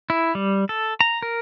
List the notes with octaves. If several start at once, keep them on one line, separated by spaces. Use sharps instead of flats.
E4
G3
A4
A#5
A#4